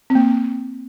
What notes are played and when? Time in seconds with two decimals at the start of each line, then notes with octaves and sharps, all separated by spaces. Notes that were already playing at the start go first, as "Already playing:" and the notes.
0.10 C4
0.15 A#3